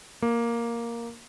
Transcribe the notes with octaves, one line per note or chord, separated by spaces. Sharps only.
A#3